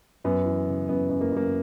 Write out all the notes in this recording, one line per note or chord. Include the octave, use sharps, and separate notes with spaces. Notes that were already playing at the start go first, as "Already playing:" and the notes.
F#2 B3
E3
C#3
F#2 B3
F#2
A#3
F#2 A#3